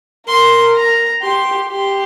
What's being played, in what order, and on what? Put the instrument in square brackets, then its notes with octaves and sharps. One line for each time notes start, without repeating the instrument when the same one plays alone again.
[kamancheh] A#4 [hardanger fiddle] C6
[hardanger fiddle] A#5
[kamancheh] G4 [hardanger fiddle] C6
[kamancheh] G4 [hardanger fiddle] C6